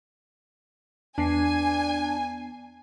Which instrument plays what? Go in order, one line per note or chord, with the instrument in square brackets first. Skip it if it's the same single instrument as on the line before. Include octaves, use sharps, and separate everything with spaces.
[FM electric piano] E2 B3 C7 [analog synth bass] D4 [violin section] G#5